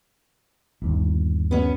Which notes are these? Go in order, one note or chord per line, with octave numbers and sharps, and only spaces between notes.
G1 D#2
B3 C#4